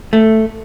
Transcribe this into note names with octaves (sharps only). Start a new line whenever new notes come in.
A3